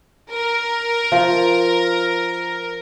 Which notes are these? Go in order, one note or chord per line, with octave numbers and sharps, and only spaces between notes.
A#4
F3